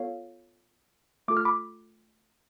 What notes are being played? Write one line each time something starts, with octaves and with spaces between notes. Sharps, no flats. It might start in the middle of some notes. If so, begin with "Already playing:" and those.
Already playing: B3 F4 A4 C#5 F5
A3 F4 A4 D6
F6
B5 D6